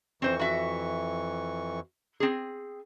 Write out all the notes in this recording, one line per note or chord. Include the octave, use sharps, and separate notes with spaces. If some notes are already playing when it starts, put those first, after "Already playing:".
F2 E3 C4 C5 C#6
F#4 E5
C4 G#4